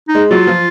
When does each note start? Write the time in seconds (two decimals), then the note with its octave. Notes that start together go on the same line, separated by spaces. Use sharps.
0.09 D#4
0.15 G#3
0.31 F#3 F4
0.47 F3